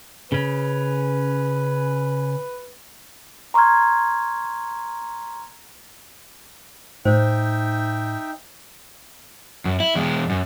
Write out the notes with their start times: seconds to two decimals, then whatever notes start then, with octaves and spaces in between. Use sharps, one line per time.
0.32 C#3 C#4 B4
3.54 A#5 C6 C#6 F6 G#6
7.05 A2 D#4 C5 E5 G5
9.65 F#2
9.80 E4
9.96 E2 G#3
10.30 F#2